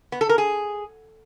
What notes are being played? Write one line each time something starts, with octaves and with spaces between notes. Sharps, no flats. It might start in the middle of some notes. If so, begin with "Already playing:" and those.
B3
A4
A#4
G#4